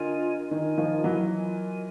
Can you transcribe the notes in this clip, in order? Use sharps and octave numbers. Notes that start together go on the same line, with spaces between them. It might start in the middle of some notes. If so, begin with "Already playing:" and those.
Already playing: D3 F4 A#4 D#5 G#5
D#3 F4 A#4 D#5 G#5
D#3 F3
E3 F#3
F4 A#4 D#5 G#5